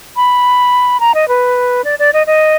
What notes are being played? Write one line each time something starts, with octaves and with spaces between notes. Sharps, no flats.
B5
A#5
D#5
B4
D5
D5
D#5
D#5